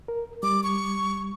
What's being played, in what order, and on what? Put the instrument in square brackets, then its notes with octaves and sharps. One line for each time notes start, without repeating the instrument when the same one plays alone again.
[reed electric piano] A#4
[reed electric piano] G3 [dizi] D6
[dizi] C#6